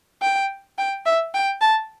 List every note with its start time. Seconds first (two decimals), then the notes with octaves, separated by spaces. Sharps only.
0.22 G5
0.78 G5
1.06 E5
1.34 G5
1.61 A5